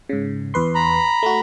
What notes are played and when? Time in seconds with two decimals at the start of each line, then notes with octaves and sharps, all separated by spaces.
0.09 G#2 C#3
0.54 E2 B4 C6
0.75 A#5 B5
1.23 A3 F#4